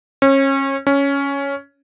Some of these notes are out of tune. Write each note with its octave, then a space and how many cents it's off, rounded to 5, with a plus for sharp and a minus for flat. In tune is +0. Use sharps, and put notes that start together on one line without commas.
C#4 -30
C#4 +5